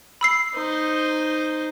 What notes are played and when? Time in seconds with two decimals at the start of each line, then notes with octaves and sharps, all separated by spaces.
0.21 B5 E6 C7
0.54 D#4 C5